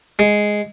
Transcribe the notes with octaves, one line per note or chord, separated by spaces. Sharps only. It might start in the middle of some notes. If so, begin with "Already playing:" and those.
G#3